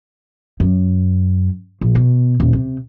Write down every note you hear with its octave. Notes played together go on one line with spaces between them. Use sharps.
F#2
A#1
B2
D#1
C3